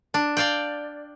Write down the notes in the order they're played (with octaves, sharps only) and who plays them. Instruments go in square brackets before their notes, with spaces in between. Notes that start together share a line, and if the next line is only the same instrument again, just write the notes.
[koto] D4
D5 F5 G5